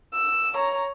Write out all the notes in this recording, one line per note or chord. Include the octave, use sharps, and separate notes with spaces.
E6
C#5 A#5